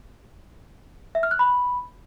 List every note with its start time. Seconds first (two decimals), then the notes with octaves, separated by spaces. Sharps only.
1.15 E5
1.23 F6
1.31 F#6
1.39 B5